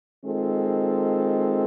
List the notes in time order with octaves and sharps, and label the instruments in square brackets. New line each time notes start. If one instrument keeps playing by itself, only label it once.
[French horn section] D#3 G#3 C4 F4 A4